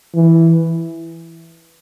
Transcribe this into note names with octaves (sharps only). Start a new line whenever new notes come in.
E3